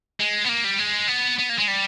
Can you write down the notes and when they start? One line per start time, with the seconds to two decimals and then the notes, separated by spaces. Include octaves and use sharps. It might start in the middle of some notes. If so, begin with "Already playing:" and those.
0.20 G#3
0.44 B3
0.49 A#3
0.64 G3
0.79 G#3
1.08 B3
1.39 B3
1.50 A#3
1.59 G#3
1.68 G3